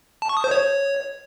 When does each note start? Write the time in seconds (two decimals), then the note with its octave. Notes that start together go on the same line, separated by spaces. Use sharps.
0.22 A5
0.29 C#6
0.37 D#6
0.44 C5
0.51 C#5